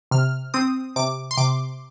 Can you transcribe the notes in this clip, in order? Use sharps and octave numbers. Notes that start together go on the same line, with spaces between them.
C3 F6
C4 D#6
C3 D6
C6
C3 D6